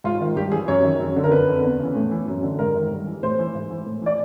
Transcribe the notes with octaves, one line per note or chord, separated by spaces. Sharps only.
G#2 F4
D#3
G2 G4
E3 G#4
F#2 C#5
D#3
F#2
D3
A#4
F2 B4
D3
E2
C#3 E3
A2
E3
F#2
D3
G#2 A#4
D#3
G2
E3
A2 C5
E3
G#2
E3
A2
E3 D5